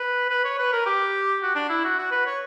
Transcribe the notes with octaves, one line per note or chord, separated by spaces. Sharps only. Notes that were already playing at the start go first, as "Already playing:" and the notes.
Already playing: B4
B4
C#5
B4
A#4
G4
F#4
D4
E4
F#4
F#4
B4
C#5